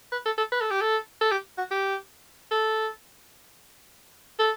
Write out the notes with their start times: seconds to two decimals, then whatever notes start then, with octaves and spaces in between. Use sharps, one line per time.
0.12 B4
0.25 A4
0.38 A4
0.52 B4
0.61 A4
0.71 G4
0.81 A4
1.21 A4
1.31 G4
1.58 F#4
1.71 G4
2.51 A4
4.39 A4